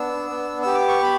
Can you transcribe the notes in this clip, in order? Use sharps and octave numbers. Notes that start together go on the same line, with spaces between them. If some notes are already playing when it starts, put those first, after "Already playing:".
Already playing: B3 D4 E6
B3
G4 E6
D6
C#6
B5